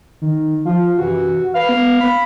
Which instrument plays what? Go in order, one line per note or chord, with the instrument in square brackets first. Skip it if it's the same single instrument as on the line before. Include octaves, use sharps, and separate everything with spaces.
[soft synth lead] D#3
[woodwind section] F3 [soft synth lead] F4
[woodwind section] F#2 C3 E3 [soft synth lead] F#4
[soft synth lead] B4 [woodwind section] F5
[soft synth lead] B3
B5